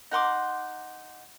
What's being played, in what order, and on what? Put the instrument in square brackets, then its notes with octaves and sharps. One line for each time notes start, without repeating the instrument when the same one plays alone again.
[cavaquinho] D#4 F#5 C6 D6